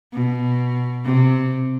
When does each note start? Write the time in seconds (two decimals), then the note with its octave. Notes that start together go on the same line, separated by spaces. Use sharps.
0.14 B2
1.05 C3